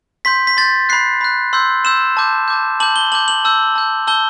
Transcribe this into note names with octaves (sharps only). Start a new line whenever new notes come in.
C6 G6 B6
B6
C6 G6 A6
B5 F#6 C7
B5 F#6
C6 E6 G6
C6 E6 G6 E7
A5 D6 G6
A5 D6 G6
A5 D6 G6 F#7
G7
A5 D6 G6 F#7
F#7
A5 E6 G6
A5 E6 G6
A5 E6 G6 G7